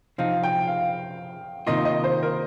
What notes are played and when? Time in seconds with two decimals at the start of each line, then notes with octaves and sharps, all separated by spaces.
0.18 C3 F3 C4 D#4 F5
0.44 G5
0.67 F5
1.67 C3 D#3 A#3 F4 D#5
1.85 D#5
2.04 C5
2.23 A#4